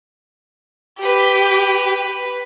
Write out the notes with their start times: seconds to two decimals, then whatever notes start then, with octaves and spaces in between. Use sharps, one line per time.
1.01 G4 B4